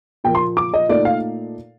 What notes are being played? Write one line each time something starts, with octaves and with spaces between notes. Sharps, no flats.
A#2 F3 A#3 G5
C6
D6
D#5
A#2 A3 D#4 D5
F5